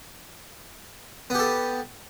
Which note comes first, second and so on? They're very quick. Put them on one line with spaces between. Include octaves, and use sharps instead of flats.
B3 G4 A4